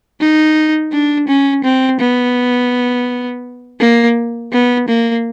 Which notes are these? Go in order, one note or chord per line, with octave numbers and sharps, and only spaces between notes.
D#4
D4
C#4
C4
B3
A#3
B3
A#3